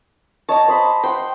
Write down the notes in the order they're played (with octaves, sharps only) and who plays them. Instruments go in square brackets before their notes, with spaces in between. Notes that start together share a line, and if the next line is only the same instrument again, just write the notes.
[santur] C#5 D#5 [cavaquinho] A5 A#5
[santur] C5 D#5 B5
[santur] C5 F#5 [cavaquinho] G5